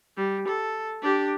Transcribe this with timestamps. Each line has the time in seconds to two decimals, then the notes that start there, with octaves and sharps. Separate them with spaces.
0.17 G3
0.48 A4
1.02 D4 G4